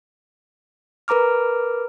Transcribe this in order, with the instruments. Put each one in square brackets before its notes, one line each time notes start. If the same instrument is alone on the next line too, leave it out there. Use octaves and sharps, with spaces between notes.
[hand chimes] A#4 B4 A#5 D6 F6